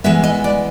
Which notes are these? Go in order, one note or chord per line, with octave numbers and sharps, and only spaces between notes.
E3 G#3 B3 E5
D#5
D5